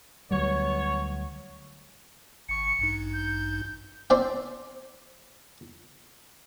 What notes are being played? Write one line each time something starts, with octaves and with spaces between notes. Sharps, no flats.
D2 F#3 G3 B3 C#5
G#1 C#6 C#7
A1 G2 D#4
G6
C4 D5 G5